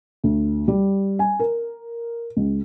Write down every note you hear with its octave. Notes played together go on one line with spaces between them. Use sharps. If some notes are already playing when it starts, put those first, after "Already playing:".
D2
G3
G#5
A#4
C#2